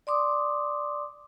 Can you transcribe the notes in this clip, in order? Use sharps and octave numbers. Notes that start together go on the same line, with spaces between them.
D5 C6 D6 D#6